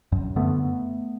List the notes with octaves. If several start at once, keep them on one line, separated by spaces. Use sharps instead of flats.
F#2
D3 A3 B3